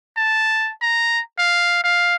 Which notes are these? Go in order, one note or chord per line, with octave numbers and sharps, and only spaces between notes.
A5
A#5
F5
F5